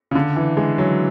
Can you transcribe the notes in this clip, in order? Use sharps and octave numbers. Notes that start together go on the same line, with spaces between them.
C#3
D3
E3
G#3
F#3